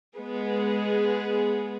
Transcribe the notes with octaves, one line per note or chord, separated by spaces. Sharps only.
G#3 B3 G#4